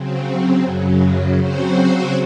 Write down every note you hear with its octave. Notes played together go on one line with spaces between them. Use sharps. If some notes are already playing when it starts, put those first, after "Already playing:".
Already playing: C#3 F#3 C4
F#2 C#3 F#3
C#3 F#3 C4 F#4 C5